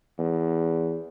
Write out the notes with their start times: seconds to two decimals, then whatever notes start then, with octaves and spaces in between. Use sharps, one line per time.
0.19 E2